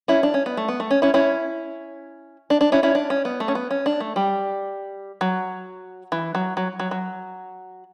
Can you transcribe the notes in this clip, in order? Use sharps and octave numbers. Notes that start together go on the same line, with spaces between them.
C#4 E4
D4
C#4
B3
A3
B3
A3
C#4
C#4 E4
C#4 E4
D4
D4
C#4 E4
C#4 E4
D4
C#4
B3
A3
C#4
B3
C#4
D4
A3
G3
F#3
E3
F#3
F#3
F#3
F#3